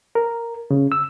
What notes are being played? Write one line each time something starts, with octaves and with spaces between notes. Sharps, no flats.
A#4
C#3
E6